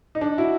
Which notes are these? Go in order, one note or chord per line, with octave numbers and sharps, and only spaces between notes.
D#4
D4
E4 F#4